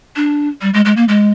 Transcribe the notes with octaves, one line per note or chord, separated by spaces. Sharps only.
D4
G3
G#3
G#3
A#3
G#3